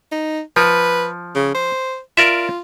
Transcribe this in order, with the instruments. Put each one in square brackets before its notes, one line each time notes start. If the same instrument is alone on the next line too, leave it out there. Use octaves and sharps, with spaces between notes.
[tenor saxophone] D#4
[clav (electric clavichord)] F3 [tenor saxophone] B4
[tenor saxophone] C#3
C5
[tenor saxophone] F4 [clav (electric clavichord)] A#4 D5 E5